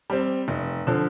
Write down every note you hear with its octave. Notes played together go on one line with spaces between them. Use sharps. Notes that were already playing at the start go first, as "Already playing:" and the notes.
G3 C4
F1
D3 F3